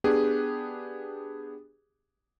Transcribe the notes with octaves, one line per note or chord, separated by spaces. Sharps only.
B3 D4 G4 G#4 B4